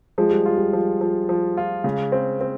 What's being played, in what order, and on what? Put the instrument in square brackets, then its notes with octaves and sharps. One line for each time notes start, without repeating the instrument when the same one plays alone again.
[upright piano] F3 [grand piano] G#3
[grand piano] G3
[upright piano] F4
[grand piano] G3
[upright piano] F3
F3
F3
F4
[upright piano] C#3 [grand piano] G#3
[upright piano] C4
C4